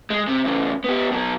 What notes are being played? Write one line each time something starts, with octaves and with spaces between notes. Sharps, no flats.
G#3
C3
E2 C#3
B3 G4
B2 F#3